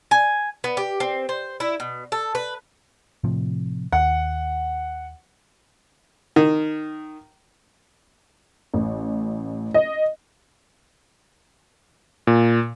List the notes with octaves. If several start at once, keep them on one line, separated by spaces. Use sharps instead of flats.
G#5
B3
G4
C4
C5
E4
B2
A4
B4
A2 C3 F3
D#2 F#5
D#3
A1
D#5
A#2